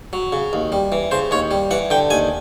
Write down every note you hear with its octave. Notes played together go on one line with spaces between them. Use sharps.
F#3
C#3
D#2
G3
E3
C#3 C5
D#2 C#5
G3
E3 F#5
D3 G5
D#2 G#5